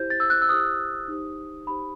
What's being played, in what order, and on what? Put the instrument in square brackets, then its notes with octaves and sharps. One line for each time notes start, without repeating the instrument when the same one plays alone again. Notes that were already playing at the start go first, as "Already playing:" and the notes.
Already playing: [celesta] E4 G4 C5 G6
A6
E6
F#6
E6
E4 G4 C5 D#6
D#4 G4 C5
D#4 G4 C5 B5